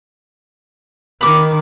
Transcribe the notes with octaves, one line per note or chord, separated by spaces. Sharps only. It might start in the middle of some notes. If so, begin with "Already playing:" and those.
D#3 B5 D6